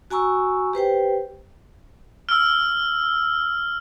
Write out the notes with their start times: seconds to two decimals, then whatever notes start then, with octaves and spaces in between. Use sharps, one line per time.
0.10 F#4 G#5 A#5 C#6 E6
0.73 G4 B4 C5 G5
2.29 E6 F6